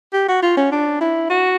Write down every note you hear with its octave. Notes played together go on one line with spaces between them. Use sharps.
G4
F#4
F4
C#4
D4
E4
F#4